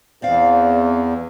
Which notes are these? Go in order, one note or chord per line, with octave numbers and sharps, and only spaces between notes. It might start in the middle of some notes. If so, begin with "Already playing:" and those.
E2 C4 D5 F5